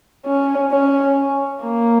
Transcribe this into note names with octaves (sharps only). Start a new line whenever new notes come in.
C#4
C#4
A#3